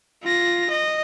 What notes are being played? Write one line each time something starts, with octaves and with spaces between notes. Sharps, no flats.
F4 A#6
D#5